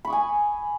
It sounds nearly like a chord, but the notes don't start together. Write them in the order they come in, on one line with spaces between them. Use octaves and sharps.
B5 C#6 D#6 G#5